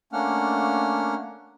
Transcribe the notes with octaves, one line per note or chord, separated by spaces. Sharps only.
A3 A#3 C#4 D4 F#5 F6